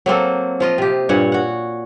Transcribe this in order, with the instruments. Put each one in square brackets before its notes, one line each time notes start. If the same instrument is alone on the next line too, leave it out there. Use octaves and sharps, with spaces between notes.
[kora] F#3 A#3 C4 A4
F3 F4 D#5
C3 G4
G2 A#2 C#5 F#5
F#4 F#5